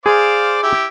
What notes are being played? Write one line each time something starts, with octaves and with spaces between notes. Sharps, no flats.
G#4 C5 D5 F5
E4 G4